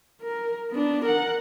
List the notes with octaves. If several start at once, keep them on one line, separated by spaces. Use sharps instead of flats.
A#4
B3 D4
A#4 F#5